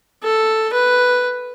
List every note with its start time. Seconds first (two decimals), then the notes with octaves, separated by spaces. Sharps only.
0.24 A4
0.74 B4